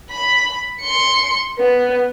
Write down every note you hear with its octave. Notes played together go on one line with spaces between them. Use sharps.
B5
C6 C#7
B3